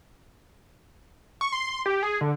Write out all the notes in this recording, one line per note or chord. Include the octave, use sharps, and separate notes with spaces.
C#6
C6
C6
G4
G#4
D3